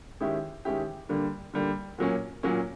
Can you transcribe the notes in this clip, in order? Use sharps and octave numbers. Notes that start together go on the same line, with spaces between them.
D#3 G#3 C#4 E4 G4
D#3 G#3 C#4 E4 G4
D3 G3 A#3
D3 G3 A#3
A#2 F#3 A#3 C#4
A#2 F#3 A#3 C#4